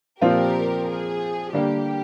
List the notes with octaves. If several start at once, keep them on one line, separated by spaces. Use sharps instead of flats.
A#2 F3 C4 F4 G4 A#4 C5
G#4
D3 G3 A#3 G4